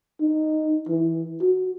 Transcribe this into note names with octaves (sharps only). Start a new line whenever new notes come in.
D#4
E3
F#4